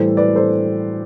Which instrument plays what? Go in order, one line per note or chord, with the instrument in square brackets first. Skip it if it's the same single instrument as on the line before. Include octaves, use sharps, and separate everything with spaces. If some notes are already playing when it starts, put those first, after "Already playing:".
Already playing: [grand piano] A2 E3 G3 [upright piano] A4 C5
[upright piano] B4 D5
A4 C5